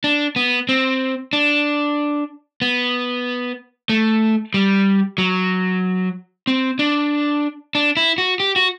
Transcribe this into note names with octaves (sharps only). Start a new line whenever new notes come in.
D4
B3
C4
D4
B3
A3
G3
F#3
C4
D4
D4
E4
F#4
G4
F#4